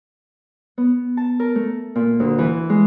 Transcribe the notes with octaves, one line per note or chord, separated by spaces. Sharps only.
B3
A5
A#4
A3
A#2
D2
E3
G#3